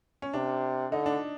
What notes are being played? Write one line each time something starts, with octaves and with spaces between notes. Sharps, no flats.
C#4
C3 D4
D3 D#4
D4